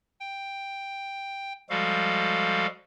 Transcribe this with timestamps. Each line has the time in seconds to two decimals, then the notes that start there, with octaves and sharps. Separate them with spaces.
0.20 G5
1.70 F3 G3 G#3 F#4 A4 F5